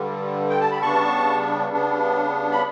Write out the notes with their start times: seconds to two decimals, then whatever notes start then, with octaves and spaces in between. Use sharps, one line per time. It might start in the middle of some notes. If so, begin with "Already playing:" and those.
Already playing: G2 D3 G3
0.50 G5
0.60 A5
0.71 B5
0.81 C#3 G3 B3 D4 A5 C#6
1.72 C#3 G3 B3 D4
2.52 B5